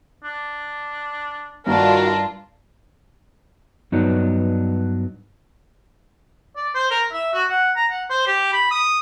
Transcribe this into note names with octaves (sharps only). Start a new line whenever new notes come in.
D4
G2 D#3 D4 F4 F#4 A#4
G2 F#3 B3 D4 D#4
D5
C5
A#4
E5
F#4
F#5
A#5
F#5
C5
G4
B5
D#6